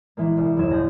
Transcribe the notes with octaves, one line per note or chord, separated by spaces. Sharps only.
A#1 E3 G#3 A#3
C2
F#1 D#2 F#3 E6 G#6 E7
A#1 D3 G#4 G6 A#6